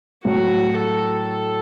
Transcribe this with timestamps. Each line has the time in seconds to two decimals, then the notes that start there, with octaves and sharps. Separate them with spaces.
0.25 A2 F#3 A3 E4 F#4
0.76 A4
1.28 A4